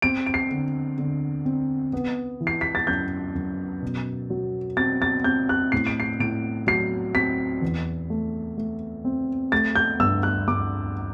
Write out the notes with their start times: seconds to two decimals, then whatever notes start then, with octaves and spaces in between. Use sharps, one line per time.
0.02 C4 D7
0.26 D7
0.34 C7
0.50 D3
0.98 D3
1.45 C4
1.93 B3
2.41 E3
2.47 C7
2.61 B6
2.75 A6
2.87 F#2 G6
3.35 F#2
3.82 B2
4.30 F#3
4.77 C4 A6
5.02 A6
5.24 C4 G6
5.49 F#6
5.72 A2 C7
5.87 D7
6.00 C7
6.19 A2 D7
6.67 F#3 C7
7.14 C4 B6
7.62 E2
8.10 A3
8.58 A3
9.05 C4
9.52 A3 A6
9.76 G6
10.00 G2 E6
10.23 F#6
10.48 G2 D6